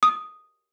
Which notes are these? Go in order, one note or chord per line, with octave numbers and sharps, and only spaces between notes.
D#6